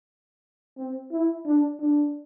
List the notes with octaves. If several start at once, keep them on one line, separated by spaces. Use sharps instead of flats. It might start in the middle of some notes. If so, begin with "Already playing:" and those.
C4
E4
D4
D4